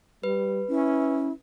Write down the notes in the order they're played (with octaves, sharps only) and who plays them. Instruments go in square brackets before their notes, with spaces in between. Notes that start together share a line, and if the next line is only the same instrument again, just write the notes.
[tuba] G3 [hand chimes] B4
[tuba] C#4 [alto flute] E4